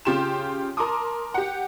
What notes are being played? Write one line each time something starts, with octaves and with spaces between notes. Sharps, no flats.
C#3 F4 G4 C6 E7
A#4 A5 A#5 C6 D6 D#6
G4 F#5